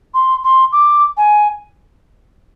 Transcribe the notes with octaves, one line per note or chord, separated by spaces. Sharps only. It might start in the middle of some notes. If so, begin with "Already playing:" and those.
C6
C6
D6
G#5